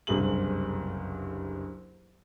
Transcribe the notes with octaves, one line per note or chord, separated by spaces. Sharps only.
F#1 C2 G2 G#4 F#7